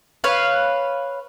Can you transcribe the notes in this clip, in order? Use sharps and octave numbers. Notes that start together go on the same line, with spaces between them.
B4 C#5 F5